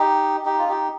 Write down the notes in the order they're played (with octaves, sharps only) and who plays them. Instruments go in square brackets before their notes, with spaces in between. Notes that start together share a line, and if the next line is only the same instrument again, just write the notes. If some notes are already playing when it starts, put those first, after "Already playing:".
Already playing: [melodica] D#4 G4
D#4 G4
F4
D#4 G4